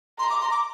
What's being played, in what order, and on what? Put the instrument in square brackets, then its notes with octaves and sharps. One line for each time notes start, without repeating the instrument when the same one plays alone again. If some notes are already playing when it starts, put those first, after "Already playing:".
[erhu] A#5 [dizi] C6
[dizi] D6
C6
D6